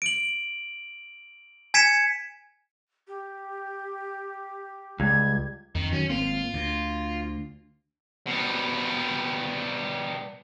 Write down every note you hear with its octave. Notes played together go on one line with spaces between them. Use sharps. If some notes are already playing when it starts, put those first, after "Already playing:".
D7 F#7
G#5 G#6 B6 C#7 E7
G4
C#2 G3 G#6
F2 D#3
D#3 F#3 C#4
G#1 A#3 C4 F4
D2
B2 G3